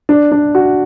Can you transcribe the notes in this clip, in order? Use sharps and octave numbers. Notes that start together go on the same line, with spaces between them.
D4
D4
F#4